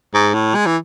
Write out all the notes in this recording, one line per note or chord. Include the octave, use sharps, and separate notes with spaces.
G#2
A2
G#3
E3